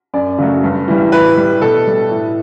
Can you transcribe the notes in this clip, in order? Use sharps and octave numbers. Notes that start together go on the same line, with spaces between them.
F#2 D5
C#3 F#3 A3
G2
E3 G3
A2 B4
G3
B2 A4
G3
A2